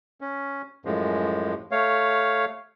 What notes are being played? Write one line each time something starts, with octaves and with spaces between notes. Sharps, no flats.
C#4
F#2 A2 F3 G#3
A3 C#5 F5